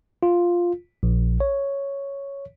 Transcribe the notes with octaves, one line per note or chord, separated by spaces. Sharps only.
F4
A#1
C#5